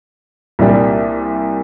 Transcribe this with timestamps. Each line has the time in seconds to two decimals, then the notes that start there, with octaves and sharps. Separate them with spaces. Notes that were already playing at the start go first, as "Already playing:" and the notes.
0.59 C2 A#2 G3 D4